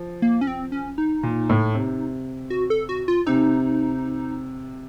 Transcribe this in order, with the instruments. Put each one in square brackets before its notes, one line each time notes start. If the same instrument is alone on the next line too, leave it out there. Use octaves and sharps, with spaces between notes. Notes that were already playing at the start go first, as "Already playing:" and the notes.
Already playing: [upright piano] F3
[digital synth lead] A#3
C#4
C4
C#4
D#4
[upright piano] A#2
A2
C3
[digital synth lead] F#4
A4
F#4
F4
[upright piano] C3 [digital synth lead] D#4